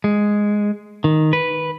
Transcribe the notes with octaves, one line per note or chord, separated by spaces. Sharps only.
G#3
D#3
B4